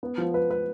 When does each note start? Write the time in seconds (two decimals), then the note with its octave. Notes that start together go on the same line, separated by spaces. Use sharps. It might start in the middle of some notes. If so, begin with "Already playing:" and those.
0.03 B3
0.18 F3
0.34 B4
0.50 B4